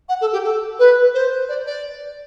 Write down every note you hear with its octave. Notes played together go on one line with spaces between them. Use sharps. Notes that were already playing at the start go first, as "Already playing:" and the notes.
F#5
A4
G4
A4
B4
C5
D5
D5